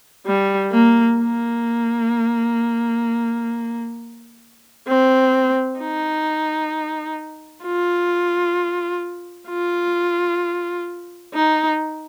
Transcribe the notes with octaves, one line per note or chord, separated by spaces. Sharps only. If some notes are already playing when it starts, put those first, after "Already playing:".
G3
A#3
A#3
C4
D#4
F4
F4
D#4